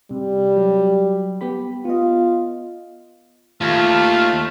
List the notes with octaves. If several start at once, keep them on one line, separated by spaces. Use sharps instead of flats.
C3 G3
F#3
B3 G4 B5
B3 F4 D#5
D#2 A3 F4 A5 F6